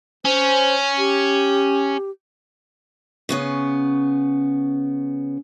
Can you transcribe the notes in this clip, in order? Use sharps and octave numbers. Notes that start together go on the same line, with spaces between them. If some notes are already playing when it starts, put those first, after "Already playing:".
C#4 C5
G4
C#3 B3 C#4